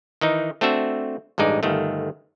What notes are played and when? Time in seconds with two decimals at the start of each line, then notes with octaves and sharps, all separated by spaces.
0.21 D#3 E3 D#4
0.61 A3 C4 D4 F#4 E5
1.38 A1 G2 G#3 D#4 D5
1.63 G1 D#3 A3